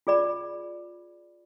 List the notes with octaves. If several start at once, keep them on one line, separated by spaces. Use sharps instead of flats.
F4 G#4 D5 B5